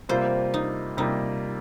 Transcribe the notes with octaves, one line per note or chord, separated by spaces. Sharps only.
C3 G3 A#3 F4 C5
D#4
C3 G3 A#3 D#4 F4